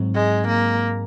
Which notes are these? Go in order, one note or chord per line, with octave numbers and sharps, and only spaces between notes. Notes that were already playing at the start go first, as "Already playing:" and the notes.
Already playing: G#2 F#3 C4
G#3
A#3